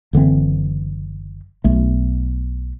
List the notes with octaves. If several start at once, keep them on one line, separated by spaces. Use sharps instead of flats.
F#1 D3 E3 C4
B1 A3